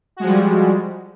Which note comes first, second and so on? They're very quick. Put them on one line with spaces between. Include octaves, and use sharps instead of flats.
F#4 G#3 F3 G3